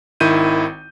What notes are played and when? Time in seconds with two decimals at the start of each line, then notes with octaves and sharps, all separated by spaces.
0.20 G#1 D#3 E4 G6 D#7